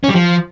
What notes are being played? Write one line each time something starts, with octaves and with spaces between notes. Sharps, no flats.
C#4
G3
F3